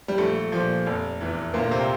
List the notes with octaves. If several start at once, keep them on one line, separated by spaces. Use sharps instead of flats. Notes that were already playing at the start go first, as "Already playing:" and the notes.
G3
A#1 A3
A#2 F3
F1
E2 E3
D2 A#2 A#3
C3 C4